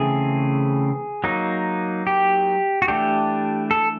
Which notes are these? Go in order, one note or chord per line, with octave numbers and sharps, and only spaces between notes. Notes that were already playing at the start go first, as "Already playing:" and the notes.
Already playing: C#3 E3 A3 C4 G#4
F#3 A#3 D#4
G4
F#4
E3 A3 D4 G4
A4